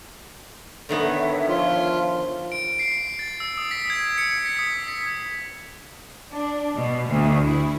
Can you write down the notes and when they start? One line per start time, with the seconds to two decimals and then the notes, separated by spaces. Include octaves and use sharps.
0.89 D3 D#3 B3 C#5 E5
1.49 F3 F4
2.52 D7
2.79 C7
3.19 A6
3.40 E6
3.58 D#6
3.71 B6
3.90 G#6
4.18 C#7
4.46 B6
4.59 D#6
4.88 B6
6.32 D4
6.75 B2
7.09 D2
7.45 E4